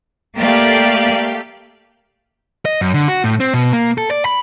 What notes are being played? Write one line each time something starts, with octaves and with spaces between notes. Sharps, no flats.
A3 A#3 G4 D5 F5
D#5
F#2
D3
F#4
A2
C4
B2
A#3
A4
D5
B5